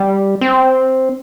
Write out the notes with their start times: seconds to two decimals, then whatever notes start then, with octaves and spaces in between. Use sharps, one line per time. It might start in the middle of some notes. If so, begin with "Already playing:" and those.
Already playing: G3
0.41 C4